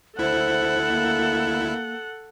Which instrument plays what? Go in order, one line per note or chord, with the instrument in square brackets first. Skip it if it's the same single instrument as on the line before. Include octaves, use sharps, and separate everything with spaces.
[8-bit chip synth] D2 E4 [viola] A4 F#5 [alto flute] C5
[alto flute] A#3